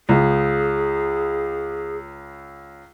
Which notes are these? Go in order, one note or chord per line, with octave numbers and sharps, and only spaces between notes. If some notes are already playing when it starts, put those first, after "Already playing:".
C#2 G#4